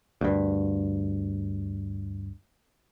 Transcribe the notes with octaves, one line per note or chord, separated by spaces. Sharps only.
D2 G2